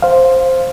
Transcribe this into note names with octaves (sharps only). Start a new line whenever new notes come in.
C5 F5